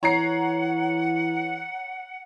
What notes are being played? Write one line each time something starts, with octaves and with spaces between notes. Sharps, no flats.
E3 C#5 F#5 A#5 C7